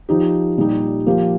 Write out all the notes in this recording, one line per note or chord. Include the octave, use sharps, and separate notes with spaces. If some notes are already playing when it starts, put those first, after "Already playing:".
F3 D#4 G4
A#2 G3 D#4 G4
F3 A#3 G4